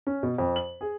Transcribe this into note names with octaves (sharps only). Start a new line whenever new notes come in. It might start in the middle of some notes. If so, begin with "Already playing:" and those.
C#4
B2
F2
F#7
G#4